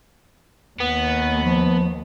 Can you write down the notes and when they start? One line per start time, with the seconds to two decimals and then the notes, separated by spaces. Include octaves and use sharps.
0.80 D#2 B3
1.42 F3